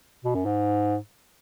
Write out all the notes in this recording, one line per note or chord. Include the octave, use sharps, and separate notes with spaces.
B2
F#2
G#2